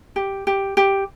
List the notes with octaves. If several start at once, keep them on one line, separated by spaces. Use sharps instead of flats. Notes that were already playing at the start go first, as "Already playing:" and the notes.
G4
G4
G4